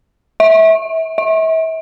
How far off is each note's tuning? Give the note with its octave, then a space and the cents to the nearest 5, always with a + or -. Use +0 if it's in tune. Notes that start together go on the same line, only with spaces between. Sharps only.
E5 -25
E5 -35